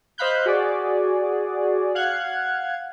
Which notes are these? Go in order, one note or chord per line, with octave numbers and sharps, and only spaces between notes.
C5 D#5 F5 B5 F#6 G6
F#4 G#4 D5
F5 F#5 F#6 G#6